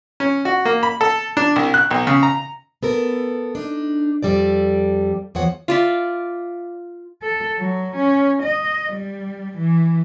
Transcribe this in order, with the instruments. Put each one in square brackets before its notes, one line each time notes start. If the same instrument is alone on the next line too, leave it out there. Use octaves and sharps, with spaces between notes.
[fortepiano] C#4
F#4
A#3
B5
A4
D4
C2
F#6
B1
C#3
A#5
[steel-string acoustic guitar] B3 A4 A#4
D4 D#4
F2 A#2 G3 A4 D5
E2 F3 C#5 F#5
[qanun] F4 D5 E5
[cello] A4
F#3
C#4
D#5
G3
E3